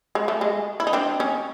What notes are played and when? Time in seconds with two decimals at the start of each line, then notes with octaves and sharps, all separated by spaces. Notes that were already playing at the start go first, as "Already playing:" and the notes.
0.15 G#3
0.28 A3
0.41 G#3
0.80 E4
0.87 D#4
0.93 C4 D4
1.20 C#4 D#4